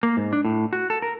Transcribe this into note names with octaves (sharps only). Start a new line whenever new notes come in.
A#3
G#2
D4
A2
F#4
A4
A#4